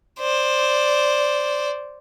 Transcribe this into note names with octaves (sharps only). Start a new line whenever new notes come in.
C5 D5